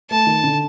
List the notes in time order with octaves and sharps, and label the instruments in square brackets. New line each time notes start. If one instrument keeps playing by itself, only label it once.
[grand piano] A3 [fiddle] A5
[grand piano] D#3
D3